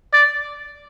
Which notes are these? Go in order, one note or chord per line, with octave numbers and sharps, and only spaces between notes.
D5